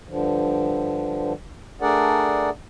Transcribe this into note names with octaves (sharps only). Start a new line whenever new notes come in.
G2 D3 F3
A3 D4 G#4 A#4 D5 F#5